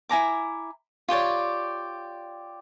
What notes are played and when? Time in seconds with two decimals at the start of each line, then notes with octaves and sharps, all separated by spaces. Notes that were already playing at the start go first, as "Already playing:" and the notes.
0.09 E4 G#5 A#5 D6
1.08 F4 G4 C#5 D5